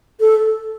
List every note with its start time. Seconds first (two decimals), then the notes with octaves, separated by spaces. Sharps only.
0.20 A4